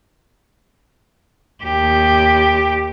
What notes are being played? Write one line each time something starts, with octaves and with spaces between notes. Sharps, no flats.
D#2 G4